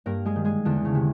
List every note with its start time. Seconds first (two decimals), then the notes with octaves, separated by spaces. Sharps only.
0.06 G2 A#3 A#4
0.25 G#3 G#4
0.36 D#3
0.45 G#3 G#4
0.65 E2 D3 D4
0.85 C#3 C#4
0.95 C3